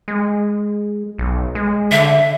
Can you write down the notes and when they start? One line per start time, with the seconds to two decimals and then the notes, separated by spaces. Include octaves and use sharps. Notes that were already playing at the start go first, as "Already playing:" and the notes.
0.08 G#3
1.18 B1
1.55 G#3
1.91 D3 E5